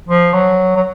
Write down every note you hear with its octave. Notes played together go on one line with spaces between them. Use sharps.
F3
F#3
F#3